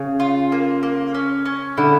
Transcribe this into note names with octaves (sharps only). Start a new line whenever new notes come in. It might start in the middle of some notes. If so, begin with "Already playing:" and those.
Already playing: C#3
F4
A#3
A#3
C#4
C#4
D3 E4